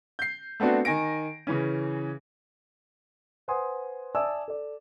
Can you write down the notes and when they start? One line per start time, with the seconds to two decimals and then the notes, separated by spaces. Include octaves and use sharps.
0.19 G6 C7
0.60 A3 B3 C4 D4 F#4
0.85 D#3 G#5 A#6 D7
1.47 C#3 E3 C#4
3.48 B4 C5 F#5 G#5 C6 D#6
4.15 D5 E5 G#5 A5 D#6 E6
4.48 A4 D5